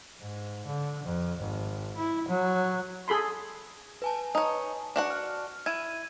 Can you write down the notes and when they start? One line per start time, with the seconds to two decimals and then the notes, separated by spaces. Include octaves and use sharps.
0.20 G#2
0.66 D3
1.04 F2
1.39 G#1
1.97 E4
2.28 F#3
3.08 G#4 A4 B5 C6
4.02 B4 G#5 A5
4.35 D#4 C#5
4.96 D4 F#4 F#5
5.10 F6
5.66 E4 G#6 D#7